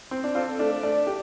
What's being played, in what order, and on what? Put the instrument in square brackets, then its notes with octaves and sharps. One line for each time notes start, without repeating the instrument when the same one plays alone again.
[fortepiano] C4
D4
[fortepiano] C4 F4 [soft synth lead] A4
[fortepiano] A3 D4
[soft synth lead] D5
[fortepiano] A3 D4
D4 G4